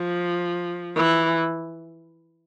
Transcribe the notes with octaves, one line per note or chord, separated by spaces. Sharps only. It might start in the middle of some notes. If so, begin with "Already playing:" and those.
Already playing: F3
E3